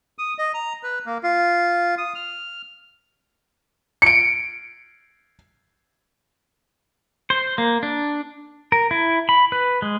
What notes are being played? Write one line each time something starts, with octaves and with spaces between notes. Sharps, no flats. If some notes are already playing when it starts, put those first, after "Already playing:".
D#6
D#5
A#5
B4
A#3
F4
D#6
F6
C#7 D7
C5
A#3
D4
A#4
E4
B5
B4
G#3